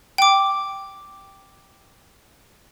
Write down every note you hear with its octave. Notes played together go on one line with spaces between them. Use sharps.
G5 D6